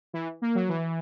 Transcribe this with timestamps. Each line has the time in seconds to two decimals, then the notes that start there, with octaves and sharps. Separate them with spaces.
0.13 E3
0.42 A#3
0.55 F#3
0.69 E3